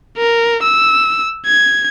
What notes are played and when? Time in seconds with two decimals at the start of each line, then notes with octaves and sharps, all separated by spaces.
0.18 A#4
0.63 E6
1.46 G#6